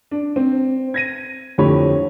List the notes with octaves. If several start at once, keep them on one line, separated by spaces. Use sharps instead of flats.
D4
C4
G#6 A#6 D#7
F2 A2 D3 G4 C#5 B5